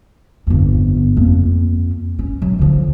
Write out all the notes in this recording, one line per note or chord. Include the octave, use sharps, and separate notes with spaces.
G1 F2
F2 A#3
C#4
F#3
D3 F3